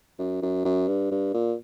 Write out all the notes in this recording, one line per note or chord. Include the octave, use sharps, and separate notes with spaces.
F#2
F#2
F#2
G2
G2
A#2